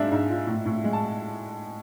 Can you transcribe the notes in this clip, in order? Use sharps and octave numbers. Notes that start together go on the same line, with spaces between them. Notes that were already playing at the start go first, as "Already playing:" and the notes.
Already playing: G#2 G#3 D4 E5 F5
G#2
F4
A2
A2
G#3
A5